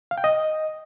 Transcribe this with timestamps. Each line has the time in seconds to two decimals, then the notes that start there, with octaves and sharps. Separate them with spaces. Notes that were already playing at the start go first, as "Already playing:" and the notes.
0.11 F5
0.18 G5
0.24 D#5